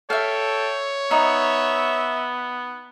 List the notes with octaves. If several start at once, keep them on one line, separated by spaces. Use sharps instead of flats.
A4 C#5 E5 F5 G5
B3 D#4 E5